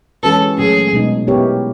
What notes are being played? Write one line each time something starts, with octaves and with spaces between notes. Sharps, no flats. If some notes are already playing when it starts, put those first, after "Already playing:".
E3 G#3 C#4 F#4 A4 B4
A#2 F#3 A3 C#4 G#4
B2 G#3 B3 D#4
B3 E4 G4 A#4 C#5